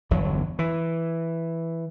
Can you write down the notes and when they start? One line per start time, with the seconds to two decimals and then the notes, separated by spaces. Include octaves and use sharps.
0.11 G1 E2 D3 F#3
0.59 E3